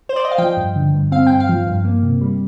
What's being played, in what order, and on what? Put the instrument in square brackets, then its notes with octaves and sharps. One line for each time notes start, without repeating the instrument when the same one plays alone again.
[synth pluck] C5
D5
D#5
F5
F3 G5
G2
D3
G2
C4 F5
G2 G5
F5
F3
G2
A#3
C3
G3